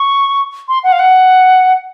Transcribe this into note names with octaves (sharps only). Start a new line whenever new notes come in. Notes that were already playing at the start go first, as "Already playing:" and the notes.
Already playing: C#6
C6
F#5
F5
F#5